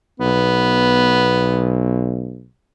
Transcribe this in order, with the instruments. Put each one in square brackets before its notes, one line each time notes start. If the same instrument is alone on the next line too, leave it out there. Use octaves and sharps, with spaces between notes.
[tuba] B1 [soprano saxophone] B3